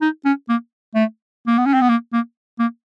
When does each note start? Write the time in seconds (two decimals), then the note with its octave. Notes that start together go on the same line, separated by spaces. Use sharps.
0.01 D#4
0.25 C#4
0.49 A#3
0.95 A3
1.47 A#3
1.58 B3
1.66 C#4
1.74 C4
1.81 B3
1.89 A#3
2.13 A#3
2.59 A#3